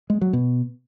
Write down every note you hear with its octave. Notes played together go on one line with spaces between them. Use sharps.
G#3
F#3
B2